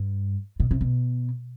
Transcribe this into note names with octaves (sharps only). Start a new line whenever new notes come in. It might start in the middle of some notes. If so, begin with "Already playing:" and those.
Already playing: G2
B2
C3
B2